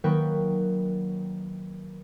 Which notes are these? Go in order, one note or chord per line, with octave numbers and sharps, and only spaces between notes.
D#3 F#3 A#3 B4 G5 C#6